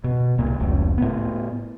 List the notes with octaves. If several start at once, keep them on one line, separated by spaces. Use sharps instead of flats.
B2
C2 A#2
F1 C#2
A2 B3